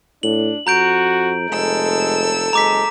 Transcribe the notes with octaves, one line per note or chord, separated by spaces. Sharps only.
A2 D4 F#7
F2 F#4 A#5 G6 D7
F1 G#3 A4 E6
F#1 G#3 A#5 D6 B6